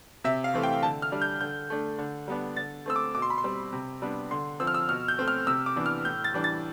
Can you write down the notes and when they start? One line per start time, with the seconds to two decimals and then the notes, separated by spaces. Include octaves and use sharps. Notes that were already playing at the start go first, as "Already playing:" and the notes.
0.24 C3 E5
0.44 F5
0.54 E3 A3 C4
0.63 G5
0.83 D3 A5
1.02 F6
1.12 G3 D4
1.22 G6
1.41 D3 G6
1.70 A3 D4
1.98 D3
2.28 G3 B3 D4
2.56 D3 A6
2.86 A3 C4 E6
2.96 D6
3.15 B2 D6
3.22 C6
3.30 B5
3.38 C6
3.44 G3 C4
3.73 C3
4.02 G3 B3 D4
4.31 D3 C6
4.60 F3 C4 E6
4.67 F6
4.74 E6
4.89 B2 F6
5.08 G6
5.18 A3 C4
5.28 F6
5.47 C3 E6
5.66 D6
5.76 E3 B3 D4
5.86 F6
6.05 A2 G6
6.24 A6
6.34 E3 G3 D4
6.44 A6